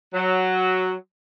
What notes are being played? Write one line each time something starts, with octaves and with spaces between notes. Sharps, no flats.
F#3